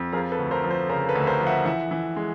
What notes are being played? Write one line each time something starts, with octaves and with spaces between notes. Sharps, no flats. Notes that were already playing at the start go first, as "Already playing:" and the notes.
Already playing: F2
F3 G#4 A#4
A4 B4
D2
A#4 C5
F3
A#4 C5
C#3 A#4 C5
A4 B4
D2
A#4 C5
F3
E5 F#5
E3 E5 F#5
E3
G#3